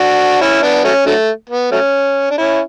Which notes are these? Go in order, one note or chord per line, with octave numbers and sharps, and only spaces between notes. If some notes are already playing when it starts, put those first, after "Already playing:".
Already playing: D4 F#4
C#4 E4
B3 D4
F#3 A3 C#4
D3 F#3 A3
B3
F#3 A3 C#4
D4
C#4 E4